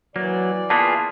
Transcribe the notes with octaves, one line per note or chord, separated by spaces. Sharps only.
E3 F#3 A#3 D5
A#3 B3 F4 G#4 A5